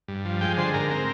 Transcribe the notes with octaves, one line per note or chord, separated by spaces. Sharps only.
G2
F3
G#3 G5
D3 C5
G#2 A#4
C4